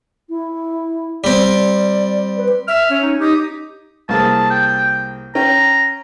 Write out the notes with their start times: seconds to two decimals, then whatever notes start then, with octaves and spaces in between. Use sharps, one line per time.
0.30 E4
1.24 G3 C4 D5
2.37 B4
2.68 E5 F6
2.90 C#4
3.02 D#4
3.20 D#4 G4
4.09 C2 A#3 G#4 A5
4.50 G5
5.35 C#4 G5 A#5